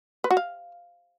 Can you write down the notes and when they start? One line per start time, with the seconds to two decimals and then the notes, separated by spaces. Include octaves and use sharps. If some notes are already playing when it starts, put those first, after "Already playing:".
0.24 B4
0.31 F#4
0.37 F5